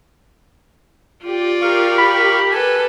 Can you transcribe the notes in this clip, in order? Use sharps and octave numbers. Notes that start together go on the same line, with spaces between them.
F4 G4 D5
G4 A#4 F5 C#6
B5
A4 B4 G#5